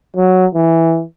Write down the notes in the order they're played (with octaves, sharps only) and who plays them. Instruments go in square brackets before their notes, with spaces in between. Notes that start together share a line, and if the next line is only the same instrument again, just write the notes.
[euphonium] F#3
E3